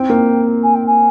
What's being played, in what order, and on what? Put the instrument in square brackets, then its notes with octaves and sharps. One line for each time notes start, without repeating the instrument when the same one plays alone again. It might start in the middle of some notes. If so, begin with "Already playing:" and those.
Already playing: [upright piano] C4 [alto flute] G5
[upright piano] A#3
[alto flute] G#5
G5
G#5